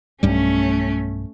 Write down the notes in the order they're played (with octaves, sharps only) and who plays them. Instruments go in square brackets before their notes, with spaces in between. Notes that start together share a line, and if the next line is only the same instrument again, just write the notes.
[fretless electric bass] B1 G2 G3 [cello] A3 C#4